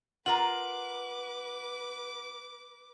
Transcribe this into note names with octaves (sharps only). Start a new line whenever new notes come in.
F4 A#4 B4 F#5 A#5 D6 F#7